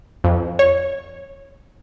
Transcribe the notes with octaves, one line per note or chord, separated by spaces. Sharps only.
F2
C#5